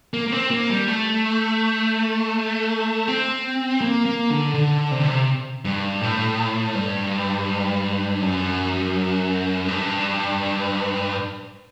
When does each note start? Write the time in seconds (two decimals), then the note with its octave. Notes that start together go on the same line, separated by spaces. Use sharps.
0.14 A#3
0.27 A#3
0.32 C4
0.51 A#3
0.69 G3
0.88 A3
3.08 C4
3.82 A#3
4.06 A#3
4.30 D3
4.54 D3
4.91 C3
5.00 D3
5.08 C3
5.65 G2
6.01 A2
6.75 G2
8.22 F#2
9.68 G2